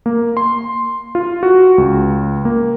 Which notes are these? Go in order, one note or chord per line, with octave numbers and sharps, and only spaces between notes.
A#3
C6
F4
F#4
C#2
A#3